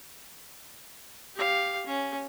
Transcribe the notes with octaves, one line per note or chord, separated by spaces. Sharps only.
G4 F5
C#4